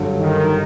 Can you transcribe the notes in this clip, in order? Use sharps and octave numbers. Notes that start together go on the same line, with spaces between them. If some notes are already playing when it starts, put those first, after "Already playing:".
Already playing: G2 D3 F#3
D#3